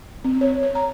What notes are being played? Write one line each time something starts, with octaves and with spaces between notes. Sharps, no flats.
C4
C#5
C#5
A#5